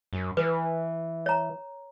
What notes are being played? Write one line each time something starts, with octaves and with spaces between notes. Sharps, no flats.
F#2
E3 B4
C#5 A#5